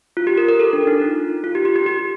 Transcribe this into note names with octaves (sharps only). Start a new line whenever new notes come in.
F4
G4
A#4
A#4
A4
D4
D#4
F4
F4
G4
G4
G4
G4